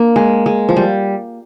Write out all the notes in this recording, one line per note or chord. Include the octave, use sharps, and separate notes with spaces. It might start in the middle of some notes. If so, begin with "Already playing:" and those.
Already playing: A#3 D4
G#3
G#3
F3
G3